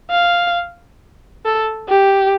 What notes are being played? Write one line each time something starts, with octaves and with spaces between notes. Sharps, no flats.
F5
A4
G4